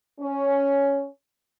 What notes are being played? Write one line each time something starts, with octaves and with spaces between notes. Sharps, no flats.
C#4